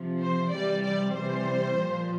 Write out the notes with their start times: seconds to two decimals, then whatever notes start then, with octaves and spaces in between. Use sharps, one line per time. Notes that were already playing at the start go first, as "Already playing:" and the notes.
Already playing: C3 F3
0.21 C5
0.51 C3 E3 G3 D5
0.82 D5
1.13 C3 E3 G3 C5
1.75 A#2 F3